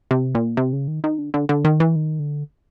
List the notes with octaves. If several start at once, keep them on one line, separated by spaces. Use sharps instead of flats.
C3
A#2
C3
C#3
D#3
D#3
D3
D3
D3
D#3
E3
D#3
D3